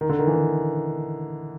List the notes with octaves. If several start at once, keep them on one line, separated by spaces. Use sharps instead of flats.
D#3
D3
D#3
E3
D#3